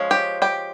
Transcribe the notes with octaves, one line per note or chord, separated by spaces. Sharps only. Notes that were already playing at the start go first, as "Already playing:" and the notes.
Already playing: F3 G#3 C#4
G4 G5
G4 G5